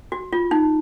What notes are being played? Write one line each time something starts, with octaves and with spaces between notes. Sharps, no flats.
F#4
F4
D#4